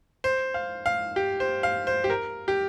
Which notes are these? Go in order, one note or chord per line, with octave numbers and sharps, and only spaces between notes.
C5
F5
F5
G4
C5
F5
C5
G4
A#4
G4